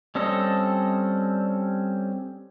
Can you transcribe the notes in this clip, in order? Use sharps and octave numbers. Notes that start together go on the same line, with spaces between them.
G3 C4 C#4 A4 D#5